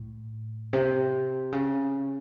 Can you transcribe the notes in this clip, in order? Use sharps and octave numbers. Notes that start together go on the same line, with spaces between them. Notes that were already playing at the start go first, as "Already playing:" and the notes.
Already playing: A2
C3
C#3